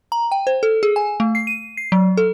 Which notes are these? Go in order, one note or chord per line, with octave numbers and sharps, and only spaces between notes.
A#5
G5
C5
A4
G#4
G#5
A3
C7
D#7
C7
F#3
A4